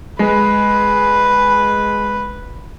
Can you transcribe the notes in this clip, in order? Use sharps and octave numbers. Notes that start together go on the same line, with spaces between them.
G#3 B4